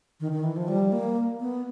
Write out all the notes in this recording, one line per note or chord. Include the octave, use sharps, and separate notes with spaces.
D#3
D#3
E3
F3
G3
A#3
B3